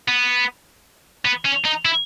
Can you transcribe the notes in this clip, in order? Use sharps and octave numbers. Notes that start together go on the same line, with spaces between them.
B3
B3
C#4
D#4
E4